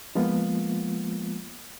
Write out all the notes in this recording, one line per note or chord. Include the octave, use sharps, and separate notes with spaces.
F3 G#3 A#3 B3 F4